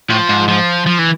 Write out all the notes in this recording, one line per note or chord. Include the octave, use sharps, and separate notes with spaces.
A2 F3
G#2
F3
F3
E3